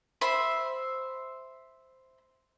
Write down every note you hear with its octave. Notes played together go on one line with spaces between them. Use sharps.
C5 E5 B5